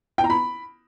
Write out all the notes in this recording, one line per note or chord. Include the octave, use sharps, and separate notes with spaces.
G5
A#5
B5